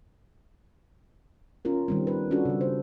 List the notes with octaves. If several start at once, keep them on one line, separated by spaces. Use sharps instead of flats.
C#4 F4 A#4
D#3 G3 C4
B4
C#4 D4 F4 F#4 A4
C#3 G3
C5